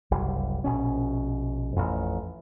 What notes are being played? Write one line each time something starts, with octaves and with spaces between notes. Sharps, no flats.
F#1 C2 G3
A#1 B2 C#4
A1 F2